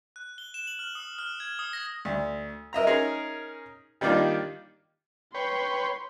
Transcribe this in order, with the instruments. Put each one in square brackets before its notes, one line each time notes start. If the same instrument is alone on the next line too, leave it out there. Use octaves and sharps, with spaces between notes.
[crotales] F#6
G7
E7
F#7
F6
D#6
F6
G#6
D#6
A#6
[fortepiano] D2
A#4 D#5 E5 A#5
C#4 D#4 G#4 A#4 A#5
D#3 G3 A#3 D4 D#4 F4
[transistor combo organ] B4 C#5 G5 [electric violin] C6